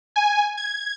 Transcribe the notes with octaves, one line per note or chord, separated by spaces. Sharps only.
G#5
G#6